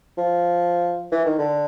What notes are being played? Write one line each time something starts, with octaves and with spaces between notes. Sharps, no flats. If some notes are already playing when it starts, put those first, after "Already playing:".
F3
E3
D#3
D3